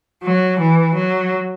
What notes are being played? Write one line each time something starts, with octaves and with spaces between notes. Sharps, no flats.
F#3
E3
F#3